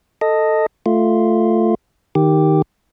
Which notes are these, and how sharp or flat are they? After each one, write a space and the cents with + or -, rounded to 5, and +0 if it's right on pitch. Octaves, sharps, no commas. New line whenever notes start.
A4 +10 D#5 +0
A3 +0 F4 +0
D#3 +0 G4 +0